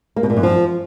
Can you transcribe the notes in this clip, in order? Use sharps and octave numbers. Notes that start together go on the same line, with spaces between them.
A#3
B2
A#2
F#2
F3